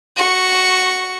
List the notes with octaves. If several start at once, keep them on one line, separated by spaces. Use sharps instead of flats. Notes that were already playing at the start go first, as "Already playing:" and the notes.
F#4 C#6